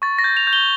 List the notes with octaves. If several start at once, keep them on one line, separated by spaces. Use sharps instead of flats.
C#6 A6
A#6
G6
F7
G6
G7